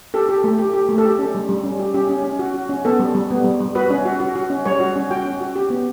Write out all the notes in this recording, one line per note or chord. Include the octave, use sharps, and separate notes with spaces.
G4 A4
G4
A3
G4
G4
A3
A4
G4
C#4
G3
G3
C#4
G4
C#4 G4
C#4
C#4
F#4
F#4
C#4
B3 A4
G3
G3
B3
G3
G3
F#4 B4
C#4
F#4
F#4
F#4
C#4
G3 C#5
F#4
C#4
F#4 G5
C#4
F#4
G4
B3